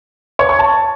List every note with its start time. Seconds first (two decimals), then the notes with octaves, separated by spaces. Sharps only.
0.39 C#5
0.49 C#6
0.59 A5